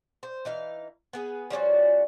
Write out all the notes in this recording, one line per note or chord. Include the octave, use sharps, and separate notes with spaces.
C5
E3 D#4 F5
B3 G#4 B4
F3 G3 C#4 F#4